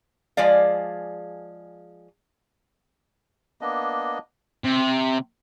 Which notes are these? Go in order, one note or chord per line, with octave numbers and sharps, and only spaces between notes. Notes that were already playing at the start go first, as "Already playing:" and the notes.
F3 G#3 G#4 D5 F5
A#3 B3 D4 D#5
C3